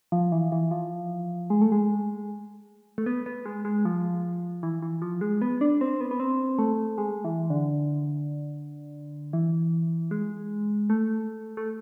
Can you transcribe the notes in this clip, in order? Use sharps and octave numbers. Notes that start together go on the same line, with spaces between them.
F3
E3
E3
F3
G#3
A3
G#3
A3
B3
B3
G#3
G#3
F3
E3
E3
F3
G#3
B3
D4
C4
B3
B3
C4
A3
G#3
E3
D3
E3
G#3
A3
A3